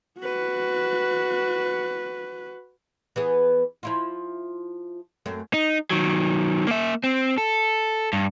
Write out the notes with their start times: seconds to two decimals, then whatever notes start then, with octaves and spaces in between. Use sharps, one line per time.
0.19 F#4 B4
3.16 E3 B3 G#4
3.83 F3 E4 F4
5.26 F#2 A3 C4
5.54 D#4
5.90 D#3 F#3
6.67 A#3 E5
7.04 C4
7.38 A4
8.13 G2